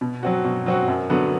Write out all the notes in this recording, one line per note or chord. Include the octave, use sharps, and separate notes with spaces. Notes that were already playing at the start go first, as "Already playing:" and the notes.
B2
F#3 C4 F#4
B2
F#3 C4 F#4
F#2
D3 F#3 B3 F#4